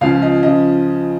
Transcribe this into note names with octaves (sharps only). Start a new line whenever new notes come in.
C#2 C#3 F3 F5
D#5
C#3 F3 D#5